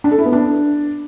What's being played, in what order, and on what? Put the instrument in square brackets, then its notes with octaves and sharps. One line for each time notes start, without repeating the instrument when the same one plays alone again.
[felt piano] D4
A4
E4
B3
D4